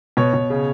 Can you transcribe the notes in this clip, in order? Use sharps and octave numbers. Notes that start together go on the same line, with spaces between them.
B2 C#5
B2
C#3